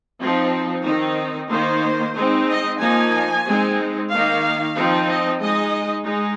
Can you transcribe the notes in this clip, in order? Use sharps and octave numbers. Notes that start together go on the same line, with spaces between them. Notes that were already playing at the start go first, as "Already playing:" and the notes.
F3 C4 D#4
D#3 C4 D#4
D#3 A#3 D#4 C5
G#3 C4 D#4
D#5
F3 A#3 D#4 G#5
G#3 C4 D#4
D#3 A#3 D#4 F5
F3 C4 D#4
D#5
G#3 D#4 D#5
G#3 D#4